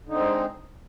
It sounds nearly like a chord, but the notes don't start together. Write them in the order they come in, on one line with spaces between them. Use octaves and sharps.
D3 D#4 C4 G#3